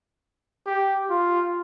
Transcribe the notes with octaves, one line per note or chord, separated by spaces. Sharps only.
G4
F4